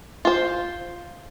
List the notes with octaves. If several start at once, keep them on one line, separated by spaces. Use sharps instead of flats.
F4 C5